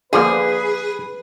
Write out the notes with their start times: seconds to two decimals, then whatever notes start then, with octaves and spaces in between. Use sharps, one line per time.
0.13 D3 F3 A#3 G#4 B4